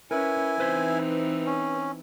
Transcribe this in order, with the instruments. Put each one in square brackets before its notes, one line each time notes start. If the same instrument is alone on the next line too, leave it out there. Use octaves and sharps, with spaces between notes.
[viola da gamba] C#4 [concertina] E4 G#5 [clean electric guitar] A#4 B4
[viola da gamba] E3 C4 D#4 [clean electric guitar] B4 C5 E5
[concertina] C#4